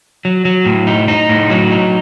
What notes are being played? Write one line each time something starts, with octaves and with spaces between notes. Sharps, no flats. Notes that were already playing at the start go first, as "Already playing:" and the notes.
F#3
F#3
A2
D#4
D#4
A2
F#3
D#4